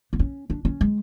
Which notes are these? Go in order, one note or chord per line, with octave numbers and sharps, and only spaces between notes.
B3
C#4
D4
C#4
G#3